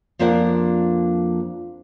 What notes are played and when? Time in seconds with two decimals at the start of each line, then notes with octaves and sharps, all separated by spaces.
0.19 F2 F3 A#3 D4 A#4 F#5